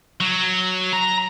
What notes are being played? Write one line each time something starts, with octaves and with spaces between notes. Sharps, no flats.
F#3
A#5